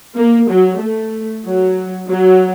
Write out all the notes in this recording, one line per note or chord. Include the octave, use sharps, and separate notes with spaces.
A#3
F#3
A3
F#3
F#3